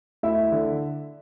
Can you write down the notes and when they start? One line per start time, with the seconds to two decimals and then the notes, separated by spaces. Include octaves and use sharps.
0.23 D2 E4 E5
0.52 D3